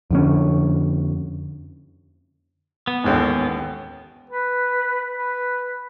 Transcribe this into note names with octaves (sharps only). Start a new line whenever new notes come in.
F2 D3 C#4
B3
A1 D#2 G#2
B4
B4